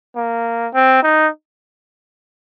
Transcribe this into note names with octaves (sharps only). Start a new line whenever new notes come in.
A#3
C4
D#4